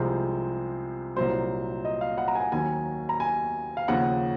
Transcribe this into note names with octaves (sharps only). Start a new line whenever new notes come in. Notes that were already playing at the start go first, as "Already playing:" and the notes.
Already playing: C2 C3 F3 G#3 C5
C2 A#2 F#3 C5
D#5
F5
F#5
A#5
G#5
D#2 D#3 F#3 G#5
A#5
G#5
F5
D#2 C#3 F3 F#5